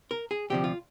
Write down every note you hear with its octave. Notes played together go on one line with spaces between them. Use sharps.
A#4
G#4
D2 C3 F3 G4
F4